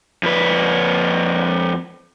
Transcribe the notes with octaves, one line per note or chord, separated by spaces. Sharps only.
F2 B4